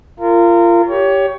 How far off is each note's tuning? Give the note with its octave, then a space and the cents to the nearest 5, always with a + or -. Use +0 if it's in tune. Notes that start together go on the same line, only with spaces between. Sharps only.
F4 -25 A#4 -25
G4 +0 C#5 +20